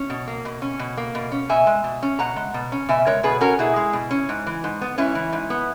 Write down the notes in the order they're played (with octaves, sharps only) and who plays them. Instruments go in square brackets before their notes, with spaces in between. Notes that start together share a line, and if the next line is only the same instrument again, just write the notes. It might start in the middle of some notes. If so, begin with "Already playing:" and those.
Already playing: [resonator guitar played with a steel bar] C#4
B2
A#3
B2
C#4
B2
A#3
B2
C#4
B2 E5 G#5
G#3
B2
C#4
B2 F#5 A#5
G#3
B2
C#4
B2 E5 G#5
G#3 A#4 C#5
B2 G#4 B4
C#4 F#4 A#4
B2 E4 G#4
G#3
B2
C#4
G#2
E3
G#2
B3
G#2 C#4 E4
E3
G#2
B3